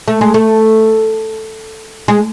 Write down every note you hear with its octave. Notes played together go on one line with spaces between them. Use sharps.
A3
G#3
A3
G#3